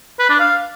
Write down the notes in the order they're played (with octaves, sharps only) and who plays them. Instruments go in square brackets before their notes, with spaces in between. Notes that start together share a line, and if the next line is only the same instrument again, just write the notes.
[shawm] B4
D4
F5